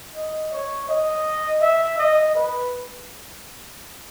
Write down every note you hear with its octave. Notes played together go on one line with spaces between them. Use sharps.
D#5
C#5
D#5
E5
D#5
B4